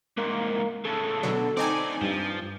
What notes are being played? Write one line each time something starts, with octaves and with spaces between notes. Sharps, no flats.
C2 G#2 A#3
A2 C#3 A4
B2 D3 F#3
D2 C4 D#4 D5 G#5
G2 F3